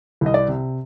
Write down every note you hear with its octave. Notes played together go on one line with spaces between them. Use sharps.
C2 D#5
D5
C3